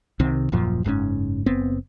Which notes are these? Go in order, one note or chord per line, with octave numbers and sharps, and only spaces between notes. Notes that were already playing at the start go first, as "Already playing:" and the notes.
C2 C3 D#3 C4
D#1 F#2 A#2 F3
F#1 G#2 C#3 C#4
F#1 B3 C4